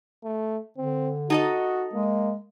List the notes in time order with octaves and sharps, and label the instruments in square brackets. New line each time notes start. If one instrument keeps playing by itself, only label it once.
[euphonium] A3
[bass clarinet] D3 [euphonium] C4
[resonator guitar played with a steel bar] D#4 A4 D#5 [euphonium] F#4
[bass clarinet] G#3 [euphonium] A#3